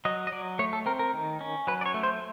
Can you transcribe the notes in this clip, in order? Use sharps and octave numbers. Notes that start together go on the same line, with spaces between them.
F#3 D#5
D#5
F#3 D5
A3 C#5
A4
C4 A#4
A#4
D#3
C#4
F#3 B4
D5
C#5
A3
C5